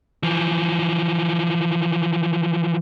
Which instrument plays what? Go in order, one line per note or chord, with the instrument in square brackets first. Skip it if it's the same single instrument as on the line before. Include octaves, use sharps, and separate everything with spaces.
[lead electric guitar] E3 F3